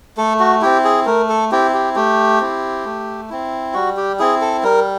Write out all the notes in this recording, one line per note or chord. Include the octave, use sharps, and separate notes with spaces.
A3 A4
F#4
C4 E4 G4
G#4
A3 A#4
A4
C4 E4 G4
G4
A3 G4
C4 E4
A3
C4 E4
G3 F#4
G4
C4 E4 G#4
A4
G3 A#4